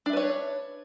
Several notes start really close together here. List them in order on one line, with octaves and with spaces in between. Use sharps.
D4 E5 B4 C#5